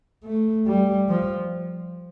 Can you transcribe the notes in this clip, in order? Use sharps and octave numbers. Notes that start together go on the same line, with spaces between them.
A3
G3
F3